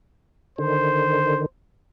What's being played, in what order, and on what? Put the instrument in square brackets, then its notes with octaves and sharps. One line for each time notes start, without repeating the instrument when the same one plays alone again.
[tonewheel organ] D3 D#3 [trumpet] C5